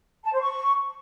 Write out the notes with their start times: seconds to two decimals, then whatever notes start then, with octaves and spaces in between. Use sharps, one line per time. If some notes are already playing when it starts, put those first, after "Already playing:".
0.23 A5
0.32 C5
0.41 C#6